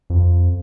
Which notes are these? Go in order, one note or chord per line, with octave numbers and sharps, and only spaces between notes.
F2